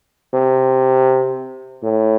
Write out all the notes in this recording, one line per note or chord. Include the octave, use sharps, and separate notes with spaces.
C3
A2